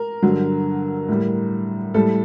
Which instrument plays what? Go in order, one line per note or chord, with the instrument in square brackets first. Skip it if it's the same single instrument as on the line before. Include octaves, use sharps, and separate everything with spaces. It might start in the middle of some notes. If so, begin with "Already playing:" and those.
Already playing: [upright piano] A#4
G2 D3 F#3
A2 G3
A2 G3 A4